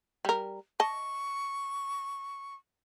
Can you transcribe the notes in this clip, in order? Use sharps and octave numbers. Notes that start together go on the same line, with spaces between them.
G3 A#4
D#5 A5 C#6